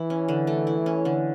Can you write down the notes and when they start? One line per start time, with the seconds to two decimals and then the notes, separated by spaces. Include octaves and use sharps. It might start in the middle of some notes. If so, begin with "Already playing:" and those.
Already playing: E3 E4
0.10 C#4
0.28 D3
0.47 A3
0.67 E4
0.86 C#4
1.05 D3